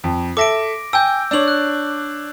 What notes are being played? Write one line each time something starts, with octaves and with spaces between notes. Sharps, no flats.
F2
A4 E5 D6 A#6 D7
G5 G#5 E6 G6
D4 C#5 E6 F#7
F#6